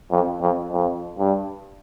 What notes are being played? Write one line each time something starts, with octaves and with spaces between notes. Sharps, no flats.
F2
F2
F2
G2